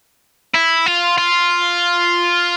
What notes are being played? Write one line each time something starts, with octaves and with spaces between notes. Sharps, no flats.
E4
F4
F4